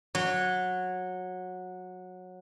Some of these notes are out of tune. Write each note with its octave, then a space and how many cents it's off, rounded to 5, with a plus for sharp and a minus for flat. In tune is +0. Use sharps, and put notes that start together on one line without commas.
F#3 -15